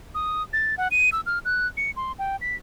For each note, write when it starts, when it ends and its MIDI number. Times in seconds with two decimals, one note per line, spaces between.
0.15 0.43 87
0.53 0.75 93
0.78 0.88 78
0.91 1.10 99
1.12 1.21 88
1.26 1.39 89
1.45 1.67 90
1.77 1.91 97
1.96 2.12 84
2.19 2.36 79
2.41 2.56 95